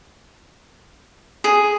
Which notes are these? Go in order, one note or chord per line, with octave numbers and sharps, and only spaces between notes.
G#4